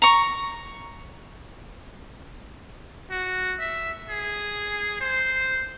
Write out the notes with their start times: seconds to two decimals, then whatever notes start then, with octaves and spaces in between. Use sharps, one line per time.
0.02 A#5 C#6
3.11 F#4
3.60 E5
4.10 G#4
5.01 C5